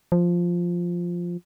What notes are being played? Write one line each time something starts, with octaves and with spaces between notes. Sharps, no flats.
F3